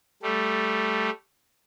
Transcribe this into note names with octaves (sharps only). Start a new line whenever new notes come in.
G3 A3